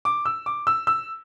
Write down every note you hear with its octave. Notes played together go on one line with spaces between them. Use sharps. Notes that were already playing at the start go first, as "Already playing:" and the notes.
D6
E6
D6
E6
E6